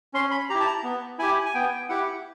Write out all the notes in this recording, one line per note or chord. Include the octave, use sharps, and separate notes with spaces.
C#4 C6
B5
E4 G4 A#5
A5
A#5
B3
E4 G4 G#5
G#5
B3 G5
E4 G4 F#5